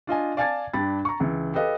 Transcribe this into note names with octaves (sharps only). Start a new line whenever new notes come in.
D4 F4 D#5 G#5
D5 F5 G#5 A5 G#6 A6
G2 D4 G4 B5 A6
A#5 C#6
C#2 E3
G4 A4 B4 D#5 F5